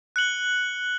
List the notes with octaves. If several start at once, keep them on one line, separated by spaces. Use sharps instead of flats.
F#6 C#7 F#7 G7